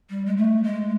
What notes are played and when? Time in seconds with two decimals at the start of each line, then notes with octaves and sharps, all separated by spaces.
0.10 G3
0.26 G#3
0.37 A3
0.64 G#3